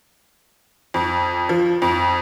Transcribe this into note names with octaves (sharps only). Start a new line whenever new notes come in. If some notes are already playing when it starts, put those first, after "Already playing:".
F2
F3
F2